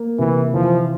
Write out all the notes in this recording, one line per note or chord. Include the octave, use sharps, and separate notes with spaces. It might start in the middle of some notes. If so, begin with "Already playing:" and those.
Already playing: A#3
C3 E3
E3 F3